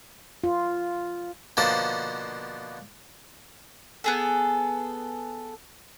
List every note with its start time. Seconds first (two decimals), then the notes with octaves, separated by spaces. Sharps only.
0.44 F4
1.57 B2 D3 F3 A#3 C5 A5
4.04 B3 G#4 A4